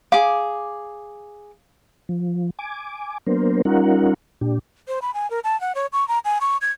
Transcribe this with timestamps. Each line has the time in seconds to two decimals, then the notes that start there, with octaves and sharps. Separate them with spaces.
0.12 G#4 F5 D6
2.09 F3
2.59 G#5 D6
3.26 F#3 A#3 B3 D4 A#4 C5
3.65 G3 C#4 D#4 F4 A#4 F#5
4.41 A#2 D4 G4
4.88 C5
5.02 B5
5.14 G#5
5.30 A#4
5.44 A5
5.61 F#5
5.75 C#5
5.93 C#6
6.08 A#5
6.25 G#5
6.41 C#6
6.61 G#6